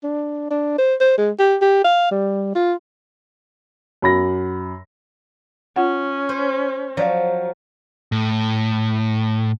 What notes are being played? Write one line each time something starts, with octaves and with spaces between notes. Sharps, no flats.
D4
D4
C5
C5
G#3
G4
G4
F5
G3
F4
F#2 B5 A#6
C#4 F4 F#5
C5
F3 F#3 C#5 D5 F5
A2